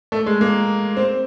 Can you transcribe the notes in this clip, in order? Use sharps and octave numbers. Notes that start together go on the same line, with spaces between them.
A3
G#3
A#3
C4